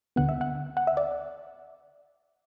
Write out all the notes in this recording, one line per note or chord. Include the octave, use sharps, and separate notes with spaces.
D2 D3 B3 F#5
E5
F#5
F#5
E5
D5